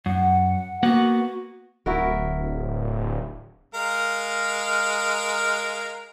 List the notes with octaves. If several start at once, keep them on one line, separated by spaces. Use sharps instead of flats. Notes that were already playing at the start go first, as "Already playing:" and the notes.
F#2 F#5
A#3 B3 F#4 F#5
D1 E4 F#4 A#4
G#3 A#4 F5